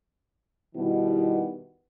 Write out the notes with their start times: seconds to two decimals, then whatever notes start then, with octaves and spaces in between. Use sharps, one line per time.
0.75 B2 D#3 G3 B3 E4